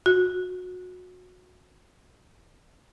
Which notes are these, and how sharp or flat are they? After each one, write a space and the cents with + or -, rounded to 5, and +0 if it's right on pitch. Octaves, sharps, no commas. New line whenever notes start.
F#4 -25